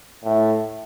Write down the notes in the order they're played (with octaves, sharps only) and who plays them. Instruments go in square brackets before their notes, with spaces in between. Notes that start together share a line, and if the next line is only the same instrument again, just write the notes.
[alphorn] A2